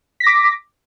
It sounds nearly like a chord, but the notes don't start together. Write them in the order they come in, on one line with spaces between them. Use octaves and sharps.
B6 A#6 D6